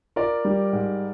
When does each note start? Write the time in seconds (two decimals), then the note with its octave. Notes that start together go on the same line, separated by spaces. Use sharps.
0.16 F4 A#4 D5
0.45 G3
0.73 G#2